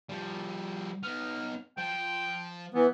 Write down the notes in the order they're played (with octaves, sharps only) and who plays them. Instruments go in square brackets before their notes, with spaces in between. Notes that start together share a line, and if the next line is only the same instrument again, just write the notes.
[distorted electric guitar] F3 G3
[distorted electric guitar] B3 D#4 [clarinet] F6
[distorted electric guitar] F3 [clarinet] G5
[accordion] E3 [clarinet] B3